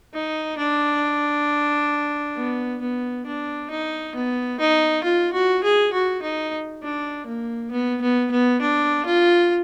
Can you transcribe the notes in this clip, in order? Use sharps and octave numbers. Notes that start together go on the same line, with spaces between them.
D#4
D4
B3
B3
D4
D#4
B3
D#4
F4
F#4
G#4
F#4
D#4
D4
A#3
B3
B3
B3
D4
F4